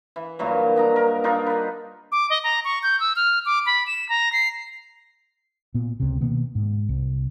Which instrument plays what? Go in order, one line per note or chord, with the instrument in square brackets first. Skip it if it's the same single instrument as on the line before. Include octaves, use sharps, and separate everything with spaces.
[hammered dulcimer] E3
G2 A#2 E3 F#3
D4 D#5 A#5
A#4
D4 D#4 F4 A#4
B4 D#5
[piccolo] D6
D#5
A#5
C#6
G6
E6
F6
D6
B5
E7
A#5
C7
[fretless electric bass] A#2 B3
C#2 C3
B2 D#3 A#3 B3
G#2
C2